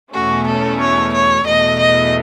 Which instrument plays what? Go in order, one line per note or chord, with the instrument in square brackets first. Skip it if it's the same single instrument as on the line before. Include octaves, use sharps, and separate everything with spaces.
[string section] E2 B2 A3 C#4 [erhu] F#4
[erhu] A4
C#5
C#5
[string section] E2 B2 A3 [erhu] D#5
[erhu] D#5